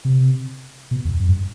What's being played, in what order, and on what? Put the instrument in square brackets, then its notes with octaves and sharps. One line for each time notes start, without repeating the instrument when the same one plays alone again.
[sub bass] C3
B2
E2
F#2
G2